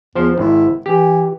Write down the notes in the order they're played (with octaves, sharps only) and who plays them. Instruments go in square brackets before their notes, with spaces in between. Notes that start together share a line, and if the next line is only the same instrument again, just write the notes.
[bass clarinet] E2 [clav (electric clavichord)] F3 C5
[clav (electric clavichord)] G#1 [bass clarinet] E4
[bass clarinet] E3 [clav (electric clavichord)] G4